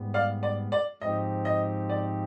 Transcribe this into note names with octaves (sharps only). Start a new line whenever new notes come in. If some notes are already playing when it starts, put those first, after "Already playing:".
Already playing: G#2 G3 B3
D5 F5
D5
D5
G#2 F3 C4 D#4 G4 D#5
D#5
D5